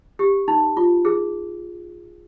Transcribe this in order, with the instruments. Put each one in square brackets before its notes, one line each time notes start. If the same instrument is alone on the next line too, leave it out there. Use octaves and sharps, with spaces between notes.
[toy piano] G4
D#4
F4
G#4